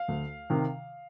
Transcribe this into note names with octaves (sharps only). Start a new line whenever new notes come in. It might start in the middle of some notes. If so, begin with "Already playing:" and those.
Already playing: F5
D2
C3 D#3